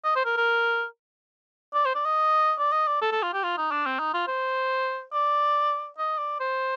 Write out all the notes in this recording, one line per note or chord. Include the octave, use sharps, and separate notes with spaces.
D#5
C5
A#4
A#4
D5
C5
D5
D#5
D5
D#5
D5
A4
A4
F4
G4
F4
D#4
D4
C4
D#4
F4
C5
D5
D#5
D5
C5